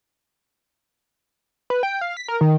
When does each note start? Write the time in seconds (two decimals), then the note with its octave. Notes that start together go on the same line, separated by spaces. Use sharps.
1.70 B4
1.83 G5
2.01 F5
2.17 B6
2.28 A#4
2.41 D#3